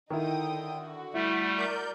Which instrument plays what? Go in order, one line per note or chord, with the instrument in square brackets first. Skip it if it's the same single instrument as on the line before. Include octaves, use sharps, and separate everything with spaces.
[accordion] D3 [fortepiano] D#3 E4 [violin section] D#4 G5 D#6
[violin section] F#4
[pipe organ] G3 A3 [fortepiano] E4
[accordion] A#4 D5 G6